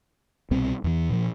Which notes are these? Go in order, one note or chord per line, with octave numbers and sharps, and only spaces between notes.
C2 B2 G3 C4
E2 E3
A#2 F3